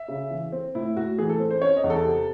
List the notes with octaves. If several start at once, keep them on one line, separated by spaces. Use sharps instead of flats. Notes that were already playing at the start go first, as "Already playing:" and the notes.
Already playing: E5
C#3
E3
C4
A2 E4
A2 F#4
E3 G#4
A4
C4
C5
C#4 C#5
D#5
E2
A4
C3